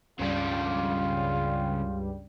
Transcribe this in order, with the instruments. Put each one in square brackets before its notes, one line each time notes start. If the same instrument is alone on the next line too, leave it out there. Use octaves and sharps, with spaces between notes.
[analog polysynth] C#2 G2 G3 [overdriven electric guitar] C#3 D4 [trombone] F4